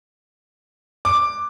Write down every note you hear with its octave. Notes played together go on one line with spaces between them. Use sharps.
D6